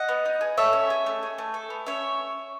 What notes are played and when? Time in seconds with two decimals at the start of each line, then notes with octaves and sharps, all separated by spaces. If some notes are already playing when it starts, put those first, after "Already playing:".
Already playing: D#5 F#5
0.09 B3
0.25 D#4
0.41 G#4
0.57 A4 C#5 E5
0.73 C#4
0.90 G#4
1.06 A3
1.23 G#4
1.38 A3
1.54 A4
1.70 B3
1.87 C#4 C#5 E5